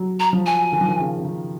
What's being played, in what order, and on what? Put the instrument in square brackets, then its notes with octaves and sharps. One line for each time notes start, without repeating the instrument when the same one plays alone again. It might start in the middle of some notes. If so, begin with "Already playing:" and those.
Already playing: [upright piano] F#3
[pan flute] A#5
[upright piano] F3
[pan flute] G#5
[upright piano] D#3
F3
D#3
C#3
C#3
D#3